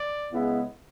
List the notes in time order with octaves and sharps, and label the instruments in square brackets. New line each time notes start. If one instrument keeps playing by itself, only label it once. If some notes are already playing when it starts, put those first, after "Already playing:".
Already playing: [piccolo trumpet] D5
[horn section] C#3 G#3 B3 E4